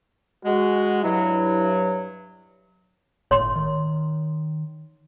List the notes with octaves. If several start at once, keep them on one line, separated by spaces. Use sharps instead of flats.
G#3 F#4
G2 F#3 E4
G1 A2 C#5 C6
D#3